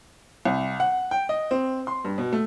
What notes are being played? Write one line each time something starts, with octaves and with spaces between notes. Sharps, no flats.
C2
F#5
G5
D#5
C4
C6
G2
B2
A3